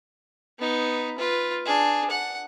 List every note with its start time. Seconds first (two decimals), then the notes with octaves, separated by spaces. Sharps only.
0.59 B3 D#4
1.18 F4 B4
1.65 D4 G#4
2.10 F#5